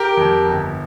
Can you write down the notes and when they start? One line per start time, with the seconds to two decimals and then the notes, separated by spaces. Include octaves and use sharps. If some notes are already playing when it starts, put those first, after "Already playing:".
Already playing: G4 A#4
0.17 F2
0.46 G1